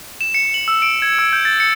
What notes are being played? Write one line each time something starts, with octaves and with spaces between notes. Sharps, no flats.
E7
C#7
F#7
E6
D7
G#6
E6
G6
A6
C#7